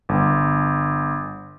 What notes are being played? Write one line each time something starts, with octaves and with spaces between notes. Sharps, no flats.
G1